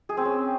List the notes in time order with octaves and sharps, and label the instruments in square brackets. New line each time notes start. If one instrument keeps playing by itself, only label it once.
[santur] G#4
C4
C#4